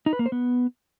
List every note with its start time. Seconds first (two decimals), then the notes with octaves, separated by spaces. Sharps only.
0.06 D#4
0.13 B4
0.19 A#3
0.26 C5
0.32 B3